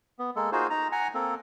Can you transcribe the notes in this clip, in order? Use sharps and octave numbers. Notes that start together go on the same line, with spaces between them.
B3
G#3 A#3 A4
A#3 D#4 F4 F#4 G#4 C5
D#4 A#5
F#5 G#5 A#5
A#3 C4 A4